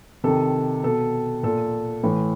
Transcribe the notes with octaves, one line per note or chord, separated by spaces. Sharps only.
C3 D#3 A4
B2 A4
A#2 A4
A2 E3